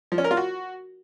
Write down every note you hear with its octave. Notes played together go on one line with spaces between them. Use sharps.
F3
C#4
A#4
F4
F#4